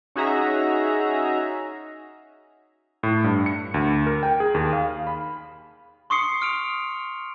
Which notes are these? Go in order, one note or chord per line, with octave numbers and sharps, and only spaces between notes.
C#4 D#4 F#4 G#4 E5 A#5
A2
G2
C#7
D2
A#4
G5
G#4
D#2
F5
B5
C6 C#6 D#6 C7 C#7
C#6 F6 D7 F7